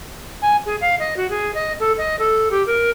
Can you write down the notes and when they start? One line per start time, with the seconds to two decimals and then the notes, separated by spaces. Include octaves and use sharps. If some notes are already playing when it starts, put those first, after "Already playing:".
0.42 G#5
0.65 G#4
0.81 F5
0.99 D#5
1.16 F#4
1.30 G#4
1.54 D#5
1.80 A4
1.98 D#5
2.19 A4
2.51 G4
2.66 A#4